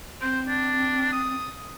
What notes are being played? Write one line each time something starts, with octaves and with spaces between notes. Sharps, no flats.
C4 C5
D4
D#6